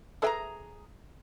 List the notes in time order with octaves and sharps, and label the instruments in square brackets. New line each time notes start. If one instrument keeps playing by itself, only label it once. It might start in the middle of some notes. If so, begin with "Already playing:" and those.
[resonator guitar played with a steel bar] G#4 G5 A#5 [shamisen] A4 B4 E5